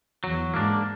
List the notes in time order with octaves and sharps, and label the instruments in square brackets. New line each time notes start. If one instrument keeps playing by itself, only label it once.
[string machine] E2 E3 [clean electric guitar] F#3
[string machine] G#2 G#3 [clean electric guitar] A#3 D4